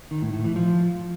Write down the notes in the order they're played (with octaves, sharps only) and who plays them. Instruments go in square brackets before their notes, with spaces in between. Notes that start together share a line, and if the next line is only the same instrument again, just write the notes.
[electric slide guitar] D#3
A2
A2
E3
F3